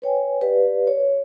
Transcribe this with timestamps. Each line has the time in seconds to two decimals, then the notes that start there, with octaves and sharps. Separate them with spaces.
0.02 B4 C#5 G5 G#5
0.41 G4 B4 D5 F5
0.87 C#5